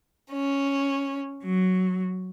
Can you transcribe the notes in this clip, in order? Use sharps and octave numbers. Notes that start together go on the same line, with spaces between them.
C#4
F#3